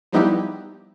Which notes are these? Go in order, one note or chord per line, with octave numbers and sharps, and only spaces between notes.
F3 G3 B3 D#4 E4 G4